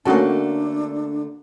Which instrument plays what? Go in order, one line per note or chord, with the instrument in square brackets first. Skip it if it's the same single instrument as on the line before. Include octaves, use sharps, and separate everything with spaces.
[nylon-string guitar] D3 A3 A#3 [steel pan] C#4 F#4 A5 [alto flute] D4